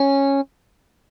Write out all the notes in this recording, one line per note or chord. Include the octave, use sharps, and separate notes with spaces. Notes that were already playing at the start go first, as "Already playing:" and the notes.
Already playing: C#4